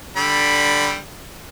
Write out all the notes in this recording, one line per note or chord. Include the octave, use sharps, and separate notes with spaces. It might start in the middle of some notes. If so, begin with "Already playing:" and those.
D3 G3 B5